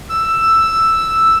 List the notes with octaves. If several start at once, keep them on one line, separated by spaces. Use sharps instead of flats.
E6